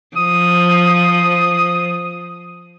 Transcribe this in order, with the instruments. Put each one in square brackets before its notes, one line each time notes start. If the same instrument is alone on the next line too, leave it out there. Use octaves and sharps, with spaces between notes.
[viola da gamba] F3 [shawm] D#6